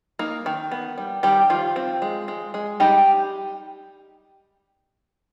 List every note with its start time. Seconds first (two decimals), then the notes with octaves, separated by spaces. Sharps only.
0.19 A#3 D#4 A#4
0.46 D#3
0.71 B3
0.98 G3
1.23 D#3 G3 G4
1.50 D#3 F3 F4
1.76 C4
2.02 G#3
2.28 G#3
2.54 G#3
2.80 G3 D#4 G4